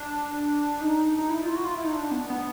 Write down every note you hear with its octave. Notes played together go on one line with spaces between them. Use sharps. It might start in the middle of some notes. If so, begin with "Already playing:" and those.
Already playing: D4
D#4
D#4
E4
F4
F#4
F4
E4
D#4
D4
B3
B3